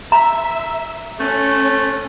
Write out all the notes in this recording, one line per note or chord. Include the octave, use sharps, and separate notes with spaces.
E5 A#5
A3 C#4